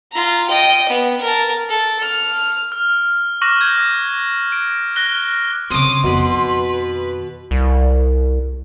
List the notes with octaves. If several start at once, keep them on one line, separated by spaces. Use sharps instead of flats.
F4 A#5
D#5 G5
B3
A#4 A5
A4
F6
F6
C#6 D6 F6 F#6 A#6 F#7
G6 G#6
D6
D7
F6 F#6 A#6 G7
C#3 C4 C#5 C6 D6 D#6
F2 B2 D#3 B4
C2